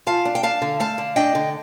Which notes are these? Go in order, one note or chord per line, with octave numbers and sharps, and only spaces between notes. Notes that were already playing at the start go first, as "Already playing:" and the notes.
F4 F5 A5
D4
G5
D4 F5 A5
D3
A3 F5 A5
D3
D4 D#5 G5
D3